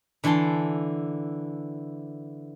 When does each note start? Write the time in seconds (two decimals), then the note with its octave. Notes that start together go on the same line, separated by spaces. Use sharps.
0.24 D3 E3 E4 A5 C6